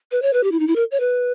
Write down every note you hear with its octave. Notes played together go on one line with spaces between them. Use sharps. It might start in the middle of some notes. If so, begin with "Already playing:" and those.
B4
C#5
B4
G4
E4
D#4
E4
A#4
C#5
B4